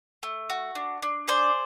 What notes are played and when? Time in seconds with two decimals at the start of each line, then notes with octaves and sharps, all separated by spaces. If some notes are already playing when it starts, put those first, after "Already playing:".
0.23 A3
0.50 F#4
0.75 D4
1.02 D4
1.28 G#4 C5 D5